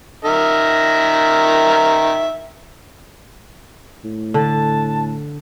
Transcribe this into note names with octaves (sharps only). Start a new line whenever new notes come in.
D#3 A#4 E5
A2
D3 A5